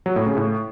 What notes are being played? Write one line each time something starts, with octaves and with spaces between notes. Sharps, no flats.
F#3
A2
C#3
A2